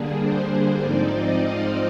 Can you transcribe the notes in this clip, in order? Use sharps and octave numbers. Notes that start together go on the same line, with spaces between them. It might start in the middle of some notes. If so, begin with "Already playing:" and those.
Already playing: D3 G3 A#3 D4 G#4
C5
G#2 F3 C4 D#4 D5
D#5
F5